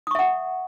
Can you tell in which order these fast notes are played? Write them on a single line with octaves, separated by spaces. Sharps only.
D#6 C#6 E5 F#5